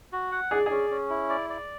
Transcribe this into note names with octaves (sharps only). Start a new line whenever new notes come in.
F#4
F#5
G#4 D5
C#4 G#4
C#4
E4
D5
D5